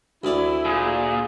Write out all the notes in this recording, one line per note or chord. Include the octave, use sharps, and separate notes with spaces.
D2 E4 D5
A#2 G#4